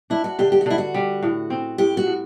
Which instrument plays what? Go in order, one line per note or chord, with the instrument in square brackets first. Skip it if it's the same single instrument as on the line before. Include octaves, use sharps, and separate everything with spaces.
[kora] D4 [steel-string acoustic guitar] E4
[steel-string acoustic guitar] F#4
[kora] D3 [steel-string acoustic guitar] G4
[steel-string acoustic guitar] G4
F#4
[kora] D3 [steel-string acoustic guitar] E4
[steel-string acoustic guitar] F#4
[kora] G3
A2
C4
[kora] A2 [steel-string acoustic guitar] G4
[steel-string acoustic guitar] F#4
[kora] A2